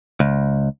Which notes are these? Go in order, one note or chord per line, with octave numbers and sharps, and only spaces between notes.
C#2